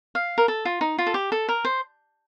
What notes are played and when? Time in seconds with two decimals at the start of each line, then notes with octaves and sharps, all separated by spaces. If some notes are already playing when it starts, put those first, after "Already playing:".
0.15 F5
0.38 A#4
0.48 A4
0.65 F4
0.81 D#4
0.98 F4
1.07 A4
1.14 G4
1.32 A4
1.49 A#4
1.65 C5